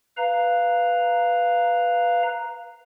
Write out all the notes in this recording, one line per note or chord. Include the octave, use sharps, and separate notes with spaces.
B4 F5 A#5